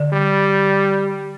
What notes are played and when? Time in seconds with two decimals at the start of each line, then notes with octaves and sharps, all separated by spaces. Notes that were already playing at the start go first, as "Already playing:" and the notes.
Already playing: D3
0.13 G3